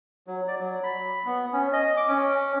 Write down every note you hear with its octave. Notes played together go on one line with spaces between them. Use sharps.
F#3
D5
F#3
B5
B3
C#4
D#5
D6
C#4